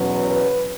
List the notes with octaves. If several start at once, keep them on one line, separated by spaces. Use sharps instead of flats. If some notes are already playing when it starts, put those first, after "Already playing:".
Already playing: E2 B2 F#3 C#4 B4
B4